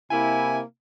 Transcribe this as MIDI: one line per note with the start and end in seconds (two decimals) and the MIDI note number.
0.11 0.59 48
0.11 0.59 58
0.11 0.59 64
0.11 0.58 80